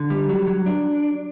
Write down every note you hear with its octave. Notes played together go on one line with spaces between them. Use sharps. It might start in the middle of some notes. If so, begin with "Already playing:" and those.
Already playing: D3
G3
F#3
F#3
D4